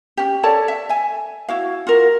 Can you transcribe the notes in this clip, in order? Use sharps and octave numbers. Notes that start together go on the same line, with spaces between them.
C#4 G4
A4 C#5 D5 A5
E5
E5 G#5
E4 F#4 F5
F4 F#4 A#4